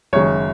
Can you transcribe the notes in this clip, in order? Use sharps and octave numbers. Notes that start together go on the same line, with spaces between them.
F#1 F#2 D#3 G#3 C#5